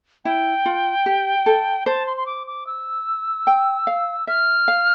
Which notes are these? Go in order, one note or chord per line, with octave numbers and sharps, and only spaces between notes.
E4 G5
F4
G4
A4
C5 A5
C6
C6
D6
D6
E6
G5
F5
E5 F6
F5